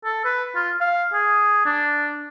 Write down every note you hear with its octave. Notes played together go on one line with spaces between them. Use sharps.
A4
B4
F4
F5
G#4
D4